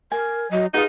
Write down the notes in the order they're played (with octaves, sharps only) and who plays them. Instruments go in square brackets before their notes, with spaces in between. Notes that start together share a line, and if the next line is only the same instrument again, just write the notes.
[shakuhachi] A#4 [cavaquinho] G#5
[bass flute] F#3 [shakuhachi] D#5
[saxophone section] D#4 [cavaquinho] F4 F#4 [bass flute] G#4 [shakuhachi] B4